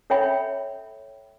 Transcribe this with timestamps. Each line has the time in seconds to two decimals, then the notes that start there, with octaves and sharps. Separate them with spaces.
0.10 A4 C#5 E5 G5 B5